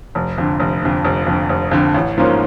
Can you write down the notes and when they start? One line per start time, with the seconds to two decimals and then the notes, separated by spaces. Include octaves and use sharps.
0.15 F1
0.38 F2 D3
0.60 F1
0.82 F2 D3
1.04 F1
1.27 F2 D3
1.49 F1
1.71 F2 D3
1.94 A1
2.17 G#2 F3 A#3 C#4